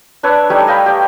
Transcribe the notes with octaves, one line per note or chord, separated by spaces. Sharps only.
D4 B4 C#5 E5
G3 A3 D#4 C#5
D#5 F5 G5 B5
G4